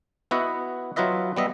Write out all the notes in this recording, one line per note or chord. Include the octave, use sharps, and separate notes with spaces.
B3 E4 F#4 B4 D#5 F#5
F#3 E4 F4 B4 D#5 E5
G3 B3 D#5 E5